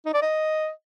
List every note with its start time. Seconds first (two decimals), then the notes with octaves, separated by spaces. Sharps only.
0.06 D#4
0.14 D5
0.22 D#5